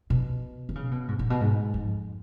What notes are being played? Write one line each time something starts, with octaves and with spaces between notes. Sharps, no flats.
B2
D#3
C#3
B2
G#2
A#2
B2
G#2
F2